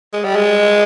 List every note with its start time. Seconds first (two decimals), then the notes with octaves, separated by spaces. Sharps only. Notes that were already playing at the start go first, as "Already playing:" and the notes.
0.13 G#3
0.24 G3
0.36 G#3